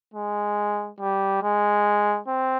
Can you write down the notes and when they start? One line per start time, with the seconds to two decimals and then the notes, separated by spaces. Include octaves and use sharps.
0.14 G#3
1.00 G3
1.43 G#3
2.28 C4